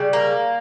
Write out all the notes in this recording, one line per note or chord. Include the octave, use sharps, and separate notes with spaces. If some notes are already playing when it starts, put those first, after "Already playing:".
Already playing: C#3 G3
A#3